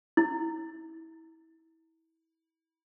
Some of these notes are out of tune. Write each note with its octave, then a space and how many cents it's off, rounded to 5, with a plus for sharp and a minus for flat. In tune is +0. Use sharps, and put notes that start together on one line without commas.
E4 -25